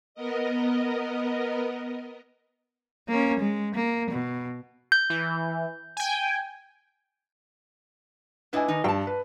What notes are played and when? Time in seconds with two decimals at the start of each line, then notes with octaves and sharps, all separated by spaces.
0.15 B3 A#4 D#5
3.08 A#3 C#4
3.39 G#3
3.74 A#3
4.10 B2
4.92 G6
5.10 E3
5.97 G5 G#5
8.53 A2 D4 E4 B4 D#5 G#5
8.68 D#3 D#4
8.84 G2 G5 A5
9.07 B4